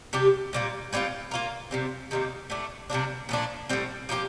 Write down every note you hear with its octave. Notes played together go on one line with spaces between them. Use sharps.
C3 G3 D4 G4
A#2 G3 A#3
A2 G3 C4 F4
A#3 F4 A#4
C3 G3 C4
C3 D#3 G3 A#3
A2 A3 D4
C3 G3 A#3 D4
A#2 F3 A3 D4
A2 G3 C4
F3 A#3 D#4 G4